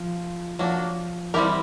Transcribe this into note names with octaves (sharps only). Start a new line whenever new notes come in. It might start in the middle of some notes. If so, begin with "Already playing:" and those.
Already playing: F3
F3 F#3 A#3 D4
E3 G3 C4 E4 G4 A#4